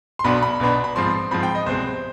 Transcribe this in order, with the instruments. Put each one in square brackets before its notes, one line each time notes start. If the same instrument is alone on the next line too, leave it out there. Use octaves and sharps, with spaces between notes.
[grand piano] C6
B1 B2 B3 D4 B5
B5
B1 B2 B3 D4
B5
G#2 F3 C4 C6
G#2 F3 C4 B5
G5
D#5
C2 B2 G#3 C4 C5